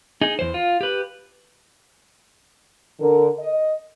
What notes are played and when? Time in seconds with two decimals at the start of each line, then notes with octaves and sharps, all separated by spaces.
0.21 D#4 G#4
0.39 E2 C5
0.54 F4
0.81 G4 B4
3.01 D3 A#4
3.40 D#5